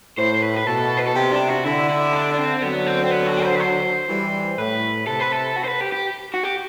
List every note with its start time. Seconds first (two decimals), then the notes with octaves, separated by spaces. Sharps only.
0.18 A2 C5
0.42 B4
0.57 B4
0.67 B2 A4
0.97 B4
1.07 A4
1.15 C3 G4
1.31 D4
1.48 F#4
1.64 D3 E4
1.90 E4
2.13 D4
2.33 D4
2.38 C4
2.62 D3 F#3 B3
2.87 C4
3.04 C4
3.11 B3
3.27 F#4
3.44 C5
3.55 B4
3.60 C5
4.09 E3 G3
4.58 A2 B4
5.07 C3 A4
5.20 B4
5.33 A4
5.57 F#4
5.64 C5
5.68 B4
5.81 G4
5.92 G4
6.34 F#4
6.44 G4